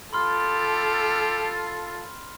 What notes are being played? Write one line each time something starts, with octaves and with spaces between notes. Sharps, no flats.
F4 G4 A4 B5 C6 F6